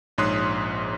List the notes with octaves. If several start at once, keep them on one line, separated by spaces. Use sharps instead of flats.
A#1 G#2 C#5 C6 D#6 F#6